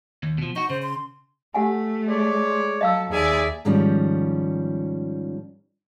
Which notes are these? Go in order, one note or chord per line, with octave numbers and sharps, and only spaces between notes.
D#2
B2 F3
D#4 F#4 C#6
C#3 C5
C6
A3 G4 F#5 G#5
G#3 C#5 D5
F#3 A4 D#5 F5 E6
D#2 G#4 D5 E5 G#5
G#2 D#3 F3 G3 C#4